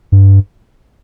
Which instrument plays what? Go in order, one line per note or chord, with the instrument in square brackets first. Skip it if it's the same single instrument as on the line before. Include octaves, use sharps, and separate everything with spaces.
[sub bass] G2